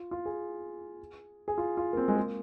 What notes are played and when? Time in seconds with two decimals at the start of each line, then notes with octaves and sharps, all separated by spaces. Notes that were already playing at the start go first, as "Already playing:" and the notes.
Already playing: F4
0.11 F4
0.26 G#4
1.48 G#4
1.58 F4
1.77 F4
1.93 A#3
1.97 C4
2.08 G#3
2.17 A#3